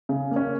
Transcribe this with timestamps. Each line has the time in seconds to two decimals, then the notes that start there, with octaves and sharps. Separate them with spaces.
0.09 C#3
0.31 A#3 C#4